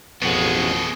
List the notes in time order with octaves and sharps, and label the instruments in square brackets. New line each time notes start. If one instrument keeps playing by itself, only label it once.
[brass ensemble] A1 F2 [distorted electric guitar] B2 G#4 [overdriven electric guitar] G#3 B3